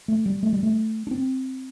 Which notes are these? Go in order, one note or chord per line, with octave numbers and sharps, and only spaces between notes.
A3
G3
A3
G3
A3
D4
C4